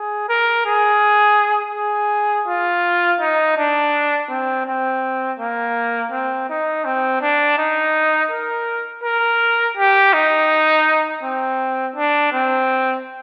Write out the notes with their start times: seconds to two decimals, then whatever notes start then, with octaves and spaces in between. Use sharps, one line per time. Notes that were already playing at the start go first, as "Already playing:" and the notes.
Already playing: G#4
0.28 A#4
0.65 G#4
1.74 G#4
2.47 F4
3.20 D#4
3.57 D4
4.29 C4
4.66 C4
5.39 A#3
6.12 C4
6.49 D#4
6.85 C4
7.22 D4
7.58 D#4
8.31 A#4
9.03 A#4
9.77 G4
10.13 D#4
11.23 C4
11.96 D4
12.32 C4